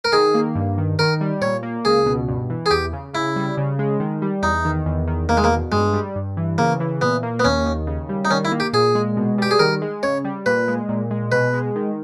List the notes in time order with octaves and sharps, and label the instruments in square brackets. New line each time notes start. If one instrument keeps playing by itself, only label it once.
[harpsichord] A#4
[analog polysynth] D#3 [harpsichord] G#4
[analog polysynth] A#3
G2
D#3
[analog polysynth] D#3 [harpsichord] A#4
[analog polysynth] G3
[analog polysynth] A#2 [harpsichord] C#5
[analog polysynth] A#3
[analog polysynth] C#2 [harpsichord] G#4
[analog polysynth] B2
G2
E3
[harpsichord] G#4
[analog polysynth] E2 [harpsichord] G4
[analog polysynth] C#3
[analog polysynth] C#3 [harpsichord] E4
[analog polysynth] G3
C#3
G#3
D#3
G3
[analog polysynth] E2 [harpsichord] D#4
[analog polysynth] D#3
E2
D#3
[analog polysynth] E2 [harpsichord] A#3
[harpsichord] G#3
A#3
[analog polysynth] B2
[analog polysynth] G2 [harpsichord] G#3
[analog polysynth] G3
G2
E3
[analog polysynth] C#3 [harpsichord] A#3
[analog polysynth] E3
[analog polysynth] A#2 [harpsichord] B3
[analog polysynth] A#3
[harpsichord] B3
[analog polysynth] D#2 [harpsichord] C#4
[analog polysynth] D#3
C#3
G3
[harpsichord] D#4
[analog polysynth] D#3 [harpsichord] C#4
[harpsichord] E4
[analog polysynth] A#3
[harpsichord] G4
[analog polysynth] A#2 [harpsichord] G#4
[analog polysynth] G#3
B2
[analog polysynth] G3 [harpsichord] G4
[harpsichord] G#4
[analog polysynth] D#3 [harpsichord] A#4
[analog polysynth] G#3
[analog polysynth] C#3 [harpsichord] C#5
[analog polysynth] G3
[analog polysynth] A#2 [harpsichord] B4
[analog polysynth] G#3
A#2
G#3
[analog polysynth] B2 [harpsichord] B4
[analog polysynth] G#3
D#3